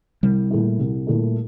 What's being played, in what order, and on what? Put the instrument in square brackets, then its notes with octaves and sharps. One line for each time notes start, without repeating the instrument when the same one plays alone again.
[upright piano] C2 [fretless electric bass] G3
[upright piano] A#2 A3 E4
C2
A#2 A3 E4